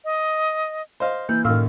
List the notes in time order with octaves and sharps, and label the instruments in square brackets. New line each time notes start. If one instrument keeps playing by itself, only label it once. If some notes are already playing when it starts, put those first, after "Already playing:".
[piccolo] D#5
[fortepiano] C5 D#5 F5
[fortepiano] E3 [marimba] A#3 [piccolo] G6
[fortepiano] F#2 D#3 [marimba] A2 F5 E6 [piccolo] F6